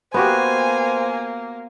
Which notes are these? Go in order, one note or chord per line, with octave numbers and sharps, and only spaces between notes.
A#3 B3 F#4 G4 C5 G#5